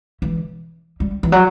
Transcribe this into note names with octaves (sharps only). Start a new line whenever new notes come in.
E3
G3
E3
F#3